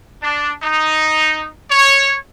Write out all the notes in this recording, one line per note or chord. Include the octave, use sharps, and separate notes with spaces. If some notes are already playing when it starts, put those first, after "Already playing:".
D4
D#4
C#5